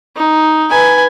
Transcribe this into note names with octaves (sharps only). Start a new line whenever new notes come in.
D#4
B4 G#5